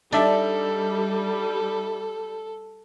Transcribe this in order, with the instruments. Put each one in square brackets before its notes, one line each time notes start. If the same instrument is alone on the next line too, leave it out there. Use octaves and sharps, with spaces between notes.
[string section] G3 [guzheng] D4 [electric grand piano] D#4 D5 E5 [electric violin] A4